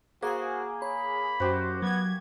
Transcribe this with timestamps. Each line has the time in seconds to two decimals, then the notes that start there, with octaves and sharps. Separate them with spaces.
0.22 A#3 F#4 G#4 C5 F5 F#5
0.82 C#5 B5
1.40 F#2 F#4 G4 C5
1.82 F#3 B3 G#6